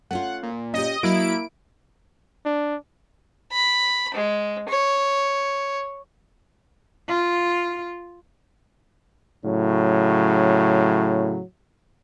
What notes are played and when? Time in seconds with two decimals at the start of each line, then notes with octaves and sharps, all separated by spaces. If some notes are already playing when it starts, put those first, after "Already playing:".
0.11 A3 C#4 F4 F#5
0.43 A#2
0.74 C#4 G4 D#5
1.03 F#3 A#3 E4 D7
2.45 D4
3.52 B5
4.14 G#3
4.68 C#5
7.08 F4
9.44 A2 C#3 F#3